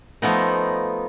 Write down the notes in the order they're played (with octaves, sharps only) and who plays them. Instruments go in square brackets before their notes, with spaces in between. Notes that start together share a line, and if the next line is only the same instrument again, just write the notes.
[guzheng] F3 A3 B3 D#4